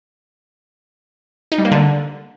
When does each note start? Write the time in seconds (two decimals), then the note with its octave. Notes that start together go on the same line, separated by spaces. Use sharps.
1.52 D#4
1.58 G3
1.65 A#3
1.72 D3